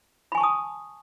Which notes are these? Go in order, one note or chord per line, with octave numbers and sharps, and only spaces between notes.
G#5 A5 B5 C#6 D#6